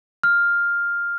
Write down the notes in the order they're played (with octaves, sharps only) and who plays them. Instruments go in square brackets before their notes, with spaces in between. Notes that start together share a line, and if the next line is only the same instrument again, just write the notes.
[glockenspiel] F6